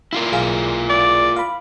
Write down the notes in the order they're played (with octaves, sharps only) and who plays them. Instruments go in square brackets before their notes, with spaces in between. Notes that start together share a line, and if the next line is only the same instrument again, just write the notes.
[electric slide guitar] E4 F4 A#4
[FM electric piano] B1 G#4 F5
[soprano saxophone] D5
[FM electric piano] F5 B5